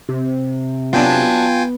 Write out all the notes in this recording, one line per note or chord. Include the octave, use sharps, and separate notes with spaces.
C3
F#3 B3 D4 F4 G5 G#5